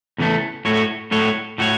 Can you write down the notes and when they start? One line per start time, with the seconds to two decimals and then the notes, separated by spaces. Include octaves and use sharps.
0.18 E2 C#3 E3 A3
0.65 A2 A3 F#4 C#5
1.11 A2 A3 F#4 C#5
1.58 A2 A3 F#4 C#5